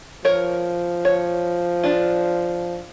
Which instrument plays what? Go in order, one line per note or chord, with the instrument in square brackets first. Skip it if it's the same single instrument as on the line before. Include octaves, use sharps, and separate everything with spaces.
[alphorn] F3 [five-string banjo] A#4 C#5
[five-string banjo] C#5
D4 F4